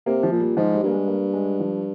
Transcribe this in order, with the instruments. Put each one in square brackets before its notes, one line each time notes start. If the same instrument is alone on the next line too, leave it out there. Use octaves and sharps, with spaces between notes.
[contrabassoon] C3 [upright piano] A#3
[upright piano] F3
[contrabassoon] A#2
[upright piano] G3
[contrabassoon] G#2 [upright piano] F3
[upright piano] G3
[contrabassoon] G2 [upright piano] A#3
[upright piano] G#3
A#3
G#3
F3